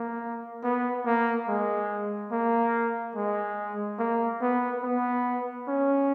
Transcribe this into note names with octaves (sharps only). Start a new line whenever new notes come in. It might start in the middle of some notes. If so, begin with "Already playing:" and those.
Already playing: A#3
B3
A#3
G#3
A#3
G#3
A#3
B3
B3
C#4